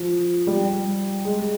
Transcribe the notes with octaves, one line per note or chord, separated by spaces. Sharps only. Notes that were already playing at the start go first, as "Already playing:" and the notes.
Already playing: F3
G3
G#3
G#3